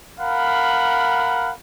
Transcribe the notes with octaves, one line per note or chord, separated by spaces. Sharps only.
A#4 F5 F#5 B5